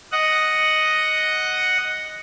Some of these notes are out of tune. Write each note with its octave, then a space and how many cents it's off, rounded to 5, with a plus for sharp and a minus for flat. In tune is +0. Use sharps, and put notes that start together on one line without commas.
D#5 +0 F#5 +0